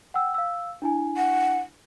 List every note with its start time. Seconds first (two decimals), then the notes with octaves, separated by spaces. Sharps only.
0.14 F#5 G5 E6
0.34 F5 E6
0.82 D4 E4 G#5
1.17 F#5